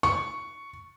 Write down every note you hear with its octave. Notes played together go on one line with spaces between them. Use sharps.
C#6